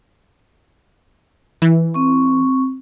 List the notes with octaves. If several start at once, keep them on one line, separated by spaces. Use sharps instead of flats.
E3
C4 C#6